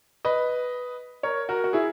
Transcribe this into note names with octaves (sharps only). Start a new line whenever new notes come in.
B4 D#5
A#4 C#5
F#4 A#4
F#4
E4 G#4